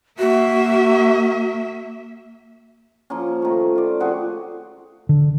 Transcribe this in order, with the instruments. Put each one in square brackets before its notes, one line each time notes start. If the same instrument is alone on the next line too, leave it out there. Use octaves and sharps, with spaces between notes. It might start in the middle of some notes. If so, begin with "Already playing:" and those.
[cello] A#3 E5 [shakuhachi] F#4
[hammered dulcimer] F3 A#3 C#4
D#3 A3
F4 D5
F3 C4 F#4 G#4
[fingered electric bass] D3